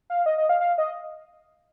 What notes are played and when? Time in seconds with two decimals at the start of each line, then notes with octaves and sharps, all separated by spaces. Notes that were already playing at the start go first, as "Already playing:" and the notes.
0.10 F5
0.26 D#5
0.38 D#5
0.49 F5
0.60 F5
0.78 D#5